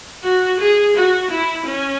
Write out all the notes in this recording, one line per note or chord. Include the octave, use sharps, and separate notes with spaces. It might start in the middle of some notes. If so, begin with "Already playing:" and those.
F#4
G#4
F#4
E4
C#4